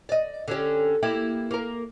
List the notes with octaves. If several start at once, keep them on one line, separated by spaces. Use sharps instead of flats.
D5 D#5
D3 C#4 G4
A#3 E4 G4
A#3 A#4